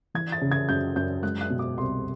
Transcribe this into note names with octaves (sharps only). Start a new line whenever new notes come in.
E3 G#6
A6
C#3
G#6
F#2 G6
F#2 G6
G#3 F#6
F#6
B2
D6
C2 C6